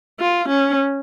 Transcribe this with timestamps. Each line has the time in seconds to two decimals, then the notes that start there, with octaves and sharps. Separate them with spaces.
0.20 F4
0.48 C#4